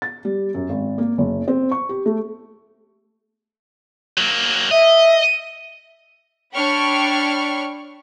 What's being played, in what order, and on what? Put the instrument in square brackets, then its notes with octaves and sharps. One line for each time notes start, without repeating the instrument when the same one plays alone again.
[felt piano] A6
G3
F#2
G#1
A#3
F#1
C4
C#6
G4
A3
[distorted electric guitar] F#3 A#3
[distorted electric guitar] D#5 [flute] E5
[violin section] D4 C#5 G5 B5 C#6 F6